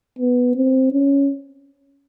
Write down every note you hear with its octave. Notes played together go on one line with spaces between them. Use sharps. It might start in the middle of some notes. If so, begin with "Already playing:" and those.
B3
C4
C#4